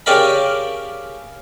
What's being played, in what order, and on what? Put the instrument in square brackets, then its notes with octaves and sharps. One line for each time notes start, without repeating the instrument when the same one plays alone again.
[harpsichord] C#3 G4 A#4 D5 F5 B5